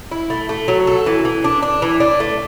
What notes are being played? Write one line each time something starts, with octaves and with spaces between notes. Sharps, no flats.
E4
A3
A3
F#3
A4
E3
E3
D4
D4
E3
D4
A3